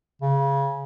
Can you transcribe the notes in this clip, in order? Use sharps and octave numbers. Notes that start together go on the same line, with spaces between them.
C#3